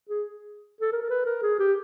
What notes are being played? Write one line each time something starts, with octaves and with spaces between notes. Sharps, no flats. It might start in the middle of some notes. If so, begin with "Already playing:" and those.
G#4
A4
A#4
A#4
B4
A#4
G#4
G4